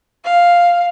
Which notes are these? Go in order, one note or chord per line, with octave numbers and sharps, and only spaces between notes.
F5